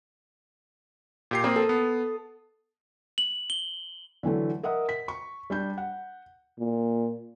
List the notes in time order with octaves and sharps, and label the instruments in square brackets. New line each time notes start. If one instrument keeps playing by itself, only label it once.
[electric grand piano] A#2 G4 C7
[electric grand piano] A#3 C4 [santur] D#6
[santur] A4
[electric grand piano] B3
[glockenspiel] F#7
G7
[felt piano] D3 E3 F#3 A3
A#4 D#5 E5 F#5 D#6
B6
C#6
G3 D4 G6
F#5
[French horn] A#2